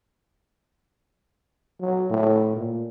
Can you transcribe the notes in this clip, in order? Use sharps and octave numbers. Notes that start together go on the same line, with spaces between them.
F#3
A2
A#2